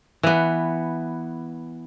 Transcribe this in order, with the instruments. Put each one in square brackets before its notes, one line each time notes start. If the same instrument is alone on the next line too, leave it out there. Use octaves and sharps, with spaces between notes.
[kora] E3 B3